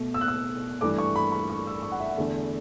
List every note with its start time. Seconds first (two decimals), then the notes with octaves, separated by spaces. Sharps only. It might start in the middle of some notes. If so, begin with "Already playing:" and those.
Already playing: B2 A3
0.14 E6
0.21 F#6
0.28 E6
0.81 G2 E3 A3 D6
0.98 C#6
1.16 B5
1.32 B5
1.50 C#6
1.67 E6
1.83 C#6
1.92 F#5
2.00 E5
2.09 F#5
2.17 E2 D3 A3